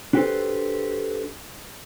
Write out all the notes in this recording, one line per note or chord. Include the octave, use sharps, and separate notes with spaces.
D4 F#4 G4 A4 B4 C5